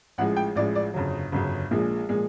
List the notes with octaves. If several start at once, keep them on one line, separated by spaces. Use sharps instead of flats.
A1 A2 F3 G#3 F#5
G5
A1 A2 F3 G#3 D5
D5
G1 F2 C#3 F#3
G1 F2 C#3 F#3
A#1 A#2 F3 G#3
A#2 F3 G#3